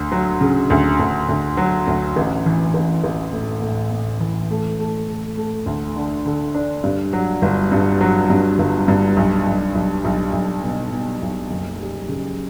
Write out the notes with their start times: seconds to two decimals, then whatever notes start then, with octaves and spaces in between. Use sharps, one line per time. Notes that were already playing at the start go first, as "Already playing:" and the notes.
Already playing: D2
0.12 F#3
0.41 C#3
0.70 D2
0.99 D2
1.29 D2
1.57 F#3
1.87 D2
2.16 A1
2.46 E3
2.74 A1
3.04 A1
3.33 A2
3.62 A2
3.91 A2
4.20 E3
4.50 A3
4.80 A3
5.09 A3
5.37 A3
5.66 D2
5.96 D3
6.26 D3
6.55 D4
6.84 G2
7.13 F#3
7.42 G1
7.72 G2
8.01 F#3
8.30 G2
8.59 G1
8.88 G2
9.17 B1
9.46 B1
9.75 B1
10.05 B1
10.33 B1
10.64 B2
10.92 B2
11.22 B1
11.51 F#1
11.80 G3
12.09 C#3